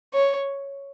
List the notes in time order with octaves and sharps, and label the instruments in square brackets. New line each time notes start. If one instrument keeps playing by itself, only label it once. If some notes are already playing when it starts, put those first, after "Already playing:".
[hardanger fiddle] C#5